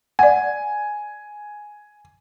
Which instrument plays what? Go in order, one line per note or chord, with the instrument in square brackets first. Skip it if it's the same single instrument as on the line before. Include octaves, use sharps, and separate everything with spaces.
[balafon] D5 F#5 [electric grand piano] G#5